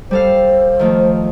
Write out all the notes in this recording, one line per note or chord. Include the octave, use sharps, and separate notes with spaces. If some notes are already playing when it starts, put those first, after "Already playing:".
G3 A4 C5 F5
D#3 F3 A3